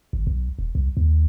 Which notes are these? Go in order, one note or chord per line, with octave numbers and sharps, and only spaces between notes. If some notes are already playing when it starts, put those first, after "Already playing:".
G#1
B1
D#1
C2
D#2